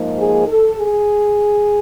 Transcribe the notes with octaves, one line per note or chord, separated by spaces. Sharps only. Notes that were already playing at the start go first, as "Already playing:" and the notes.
Already playing: G#2 F3 A#3 D#4
G#4
A4
G#4